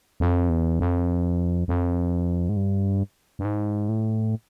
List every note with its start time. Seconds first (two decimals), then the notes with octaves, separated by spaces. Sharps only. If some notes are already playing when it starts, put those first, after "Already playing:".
0.20 F2
0.50 E2
0.80 F2
1.68 F2
2.49 G#2
2.57 G2
3.39 G2
3.45 G#2
3.89 A2